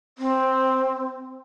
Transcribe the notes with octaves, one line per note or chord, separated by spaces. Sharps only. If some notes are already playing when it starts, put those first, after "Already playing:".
C4